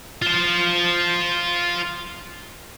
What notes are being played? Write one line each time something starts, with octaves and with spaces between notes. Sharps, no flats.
F4 C5